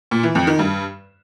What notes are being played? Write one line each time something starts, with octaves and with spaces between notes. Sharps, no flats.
A#2
E3
F2
D#3
G2